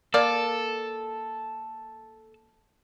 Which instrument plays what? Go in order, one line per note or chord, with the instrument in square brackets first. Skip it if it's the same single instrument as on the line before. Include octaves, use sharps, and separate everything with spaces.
[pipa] A#3 D5 [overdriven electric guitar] A4